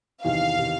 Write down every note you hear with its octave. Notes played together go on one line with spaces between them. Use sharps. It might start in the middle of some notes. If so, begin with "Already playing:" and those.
E2 C3 D#3 F5
C3 D#3